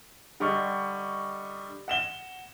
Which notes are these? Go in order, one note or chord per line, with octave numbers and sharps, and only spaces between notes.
D3 G3 D#5 C#6
F#5 E7 G7